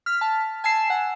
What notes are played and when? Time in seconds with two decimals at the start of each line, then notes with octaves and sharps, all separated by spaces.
0.06 F6 B6
0.21 A5
0.64 G#5 A5 E6 C7 E7
0.90 F#5